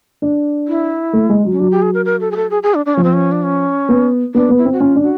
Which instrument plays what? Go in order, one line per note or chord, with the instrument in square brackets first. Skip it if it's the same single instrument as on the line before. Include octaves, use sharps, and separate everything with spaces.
[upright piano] D4
[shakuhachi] E4
[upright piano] A3
G#3
F#3
[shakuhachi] C#4
[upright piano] F#3 [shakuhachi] D4
[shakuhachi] G4
G#4
A#4
A#4
A4
G#4
A4
G#4
G#4
D4
D4
[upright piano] F3 [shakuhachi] C#4
[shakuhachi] C4
C#4
D4
C#4
[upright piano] B3
[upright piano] B3 [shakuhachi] D4
[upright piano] B3
[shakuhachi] E4
[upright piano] C4
[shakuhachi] F#4
[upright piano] C#4 [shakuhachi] F4
[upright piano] D4
[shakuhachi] F#4